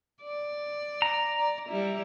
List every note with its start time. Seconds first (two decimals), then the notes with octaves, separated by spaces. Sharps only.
0.23 D5
1.02 A#5
1.38 D5
1.69 G3 E4